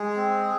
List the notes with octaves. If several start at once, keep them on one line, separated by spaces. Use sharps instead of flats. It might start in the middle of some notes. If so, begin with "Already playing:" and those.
Already playing: G#3 G#4
C4